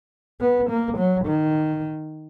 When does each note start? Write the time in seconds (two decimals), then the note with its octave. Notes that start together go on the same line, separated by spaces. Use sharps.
0.40 B3
0.69 A#3
0.97 F#3
1.25 D#3